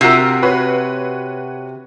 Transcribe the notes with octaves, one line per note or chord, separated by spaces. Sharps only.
C3 F4 F#4 A#4
F#4 B4 C#5